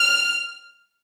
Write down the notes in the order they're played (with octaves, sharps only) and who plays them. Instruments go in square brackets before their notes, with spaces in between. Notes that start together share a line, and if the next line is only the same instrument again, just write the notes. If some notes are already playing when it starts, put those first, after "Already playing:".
Already playing: [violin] F6